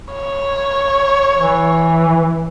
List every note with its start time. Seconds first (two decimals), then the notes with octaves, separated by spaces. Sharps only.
0.13 C#5
1.38 E3